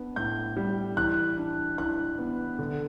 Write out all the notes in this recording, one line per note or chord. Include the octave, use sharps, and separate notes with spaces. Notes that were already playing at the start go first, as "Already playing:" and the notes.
Already playing: B3 D4
A2 G6
G3
E3 F#6
D4
E3 F#6
B3
D3